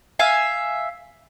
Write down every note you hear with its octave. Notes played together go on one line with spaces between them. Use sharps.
E5 F5 G#5